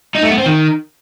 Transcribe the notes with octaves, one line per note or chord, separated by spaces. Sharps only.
D#4
A3
B3
C4
D#3